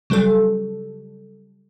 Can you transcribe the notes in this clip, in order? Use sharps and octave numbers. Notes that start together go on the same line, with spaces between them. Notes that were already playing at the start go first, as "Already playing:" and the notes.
C#3 F#3 G3 A4